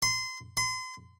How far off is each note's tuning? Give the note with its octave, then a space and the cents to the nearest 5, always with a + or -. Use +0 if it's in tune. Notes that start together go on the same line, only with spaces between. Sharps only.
C6 -25
C6 -35